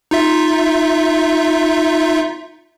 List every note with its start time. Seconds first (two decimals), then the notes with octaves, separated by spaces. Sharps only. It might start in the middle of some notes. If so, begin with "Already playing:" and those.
0.11 D#4 F4 E5